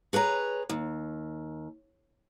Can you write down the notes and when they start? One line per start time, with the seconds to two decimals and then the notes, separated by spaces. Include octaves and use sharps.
0.13 G#4 B4 C#5 A#5
0.69 D#2